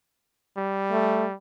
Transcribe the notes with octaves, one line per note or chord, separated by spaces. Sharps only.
G3
A3